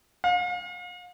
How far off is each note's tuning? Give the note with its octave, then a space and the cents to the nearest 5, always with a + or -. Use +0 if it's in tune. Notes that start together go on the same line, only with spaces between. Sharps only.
F5 +40